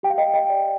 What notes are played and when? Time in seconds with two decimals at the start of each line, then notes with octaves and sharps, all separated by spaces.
0.03 G4 G5
0.10 F5
0.18 D#5 G5
0.34 D#5 G5
0.50 D5